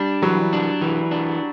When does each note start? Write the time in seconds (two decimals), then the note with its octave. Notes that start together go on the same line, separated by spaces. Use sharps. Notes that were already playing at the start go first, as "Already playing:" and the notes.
Already playing: G3 D4
0.22 E3 F#3
0.53 D4
0.81 E3
1.11 D4